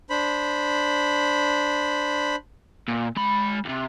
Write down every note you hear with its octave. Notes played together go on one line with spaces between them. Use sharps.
D4 C5 B5
A#2
G#3 B5
D#2 C3